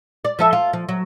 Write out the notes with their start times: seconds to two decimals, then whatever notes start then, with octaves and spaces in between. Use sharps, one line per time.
0.25 D5
0.39 F3 A4 E5
0.53 F4
0.73 F3
0.89 F#3